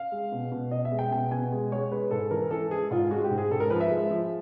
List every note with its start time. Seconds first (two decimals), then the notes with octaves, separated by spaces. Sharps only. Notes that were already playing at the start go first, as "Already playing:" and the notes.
Already playing: F5
0.12 G#3
0.32 B2
0.52 B2
0.71 B2 D#5
0.85 E5
0.91 G#3
0.99 G5
1.11 B2 G5
1.31 B2 G#5
1.52 G#3
1.72 G#3 C#5
1.92 G#3 B4
2.11 G#2 A4
2.31 E3 A#4
2.51 E3 A4
2.71 G#3 G#4
2.91 G#2 F4
3.10 G#3 F#4
3.24 G4
3.31 G#2
3.38 G#4
3.51 G#2 A4
3.60 A#4
3.70 F3 B4
3.80 E5
3.91 G#3
4.11 F3